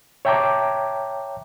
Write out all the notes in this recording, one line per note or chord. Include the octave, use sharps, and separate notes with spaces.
C#5 E5 G5 A5 A#5 D6